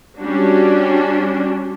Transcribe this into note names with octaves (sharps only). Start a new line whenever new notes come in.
G3 C#4 D4 F#4